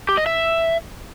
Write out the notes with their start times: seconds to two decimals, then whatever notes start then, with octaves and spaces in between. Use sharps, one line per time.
0.09 G4
0.17 D#5
0.26 E5